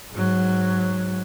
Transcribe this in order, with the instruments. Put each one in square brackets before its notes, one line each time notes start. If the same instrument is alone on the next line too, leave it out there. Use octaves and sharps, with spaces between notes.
[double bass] G#2 F#3